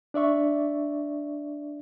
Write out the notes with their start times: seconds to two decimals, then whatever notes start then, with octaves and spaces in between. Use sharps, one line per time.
0.14 D4 D5 E5 C#6